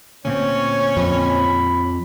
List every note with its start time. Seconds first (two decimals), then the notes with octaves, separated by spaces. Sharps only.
0.25 D2 A#2 C4 C#4 C#5
0.97 F2 B5